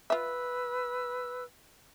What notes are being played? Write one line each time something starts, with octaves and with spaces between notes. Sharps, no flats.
F4 B4 E5 E6